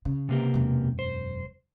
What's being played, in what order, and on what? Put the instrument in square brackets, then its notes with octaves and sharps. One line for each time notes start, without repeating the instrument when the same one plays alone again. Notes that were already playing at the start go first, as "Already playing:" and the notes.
[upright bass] C#3
[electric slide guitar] C3 A#3 G4
[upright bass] E1 F#2
[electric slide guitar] C5